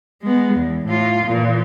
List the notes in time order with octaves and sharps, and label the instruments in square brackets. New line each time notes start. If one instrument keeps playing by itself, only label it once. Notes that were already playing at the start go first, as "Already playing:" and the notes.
[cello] G#3 B3
E2
A2 F4
A#2 E3